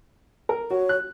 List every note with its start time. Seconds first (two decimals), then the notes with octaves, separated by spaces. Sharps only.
0.49 A#4
0.70 F#4 C#5
0.89 F#6